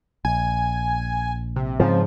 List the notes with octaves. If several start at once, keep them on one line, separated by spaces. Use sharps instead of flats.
A#1 G#5
C3
G#2 C#3 F3 C4